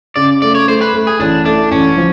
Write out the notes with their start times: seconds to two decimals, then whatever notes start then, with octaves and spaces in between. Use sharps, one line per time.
0.16 C#3 D5
0.42 A3 D5
0.55 C#5
0.68 A3 C5
0.81 B4
0.94 A3
1.07 G#4
1.19 A1 D4
1.45 A3 D4
1.71 A1 C#4
1.97 F3